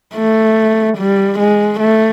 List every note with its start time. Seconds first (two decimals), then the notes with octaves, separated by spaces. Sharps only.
0.16 A3
0.98 G3
1.39 G#3
1.80 A3